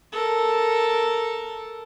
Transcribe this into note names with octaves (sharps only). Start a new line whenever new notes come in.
A4 A#4